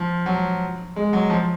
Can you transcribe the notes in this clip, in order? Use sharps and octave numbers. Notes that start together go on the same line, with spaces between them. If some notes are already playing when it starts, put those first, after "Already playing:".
Already playing: F3
F#3
G#3
F#3
F3